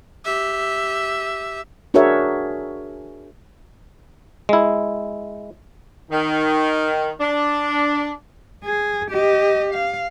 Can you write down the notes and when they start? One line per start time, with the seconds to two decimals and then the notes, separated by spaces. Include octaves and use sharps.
0.25 G4 E5
1.94 D4 F#4 G#4 A#4 C#5 E5
4.49 G#3 E4
6.11 D#3
7.20 D4
8.65 G#4
9.11 G4 D#5
9.73 F5